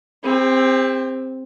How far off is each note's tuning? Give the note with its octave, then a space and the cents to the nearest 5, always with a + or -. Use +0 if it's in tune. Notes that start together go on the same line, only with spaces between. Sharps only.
C4 +0 G4 +45